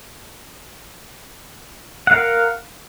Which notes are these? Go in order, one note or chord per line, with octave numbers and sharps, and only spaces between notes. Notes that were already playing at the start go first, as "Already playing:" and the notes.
A#4 F5 F#5